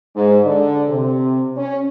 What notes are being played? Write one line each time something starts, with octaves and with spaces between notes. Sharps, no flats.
G#2
D3
C3
C#4